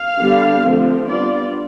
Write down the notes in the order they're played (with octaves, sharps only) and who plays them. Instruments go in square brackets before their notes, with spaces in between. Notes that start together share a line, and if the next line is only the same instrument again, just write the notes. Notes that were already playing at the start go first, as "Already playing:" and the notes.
Already playing: [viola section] F5
D3 G3 B3
D3 F3 A3 C4
G3 B3 D4 F4 D5